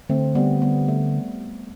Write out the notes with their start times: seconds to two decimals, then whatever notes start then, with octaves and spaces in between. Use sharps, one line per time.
0.09 D3 A3 C4
0.35 G3 B3
0.62 G3 B3
0.88 A3